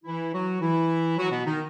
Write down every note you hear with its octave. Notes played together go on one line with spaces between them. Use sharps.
E3 E4
F#3 F#4
E3 E4
F#3 F#4
B2 B3
D#3 D#4